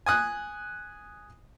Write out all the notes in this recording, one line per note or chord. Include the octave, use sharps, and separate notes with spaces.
G#5 D#6 F#6